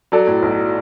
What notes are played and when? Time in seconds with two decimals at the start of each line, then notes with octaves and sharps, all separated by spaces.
0.12 F#3 A4 D5
0.27 A2
0.43 B1